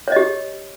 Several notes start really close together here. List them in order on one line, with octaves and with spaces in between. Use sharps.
C#5 D#5 G4